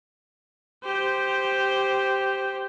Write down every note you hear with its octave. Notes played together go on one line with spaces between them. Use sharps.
G4 C5